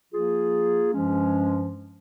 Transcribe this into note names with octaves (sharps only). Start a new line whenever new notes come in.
F3 A#3 F4 G#4
G2 F3 G#3 C#4